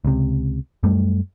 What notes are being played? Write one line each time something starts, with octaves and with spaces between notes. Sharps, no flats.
C#2 C3
F#2 G3 A3